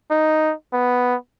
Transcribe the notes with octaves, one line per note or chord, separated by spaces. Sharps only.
D#4
B3